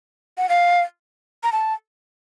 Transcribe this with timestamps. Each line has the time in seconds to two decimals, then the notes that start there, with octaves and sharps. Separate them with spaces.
0.38 F#5
0.49 F5
1.43 A#5
1.52 A5